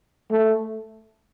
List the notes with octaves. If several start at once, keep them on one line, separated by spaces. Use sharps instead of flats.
A3